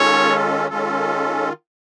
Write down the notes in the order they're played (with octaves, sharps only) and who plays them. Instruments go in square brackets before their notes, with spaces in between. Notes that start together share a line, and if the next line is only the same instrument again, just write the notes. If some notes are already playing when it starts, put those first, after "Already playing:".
Already playing: [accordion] D#3 G#3 C#4 F4 A4 [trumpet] C#5
[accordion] D#3 G#3 C#4 F4 A4